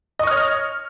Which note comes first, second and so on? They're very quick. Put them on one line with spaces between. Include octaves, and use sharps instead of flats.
D#5 C#6 F6 C#5